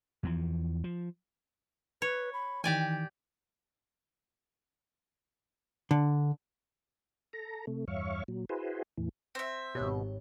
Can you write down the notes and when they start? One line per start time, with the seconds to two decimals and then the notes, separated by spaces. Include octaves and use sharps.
0.23 E2 E3 F3
0.84 F3
2.02 B4 C#5
2.33 B5
2.64 D#3 E3 G4 D5 G5 G#5
5.91 D3
7.33 A4 A#5
7.67 C3 A3
7.88 E2 G2 C#5 E5 F5 C#6
8.28 A#2 F#3
8.49 E4 F#4 G#4 B4 C5
8.98 E2 A2 E3
9.35 C4 E5
9.75 G#1 B2 G4 C#5